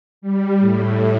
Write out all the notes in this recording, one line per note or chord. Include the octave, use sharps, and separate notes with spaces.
G3
A2